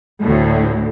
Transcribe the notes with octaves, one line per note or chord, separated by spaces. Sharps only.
D2 A2